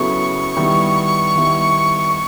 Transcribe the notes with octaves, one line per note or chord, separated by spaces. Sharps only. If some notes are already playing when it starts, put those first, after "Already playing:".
Already playing: C#3 F#3 B3 E4 A4 C#6
D#3 G3 B3 E4
D#3 G3 B3 E4